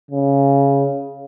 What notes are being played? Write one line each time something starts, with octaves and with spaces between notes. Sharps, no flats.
C#3